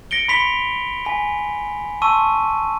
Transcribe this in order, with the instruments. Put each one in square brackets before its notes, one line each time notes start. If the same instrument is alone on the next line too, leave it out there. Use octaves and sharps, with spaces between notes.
[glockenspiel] A#6 C#7 D7 G7
B5 C6 B6 C#7 F7 G7
G#5 B6
A5 C6 C#6 E6 D#7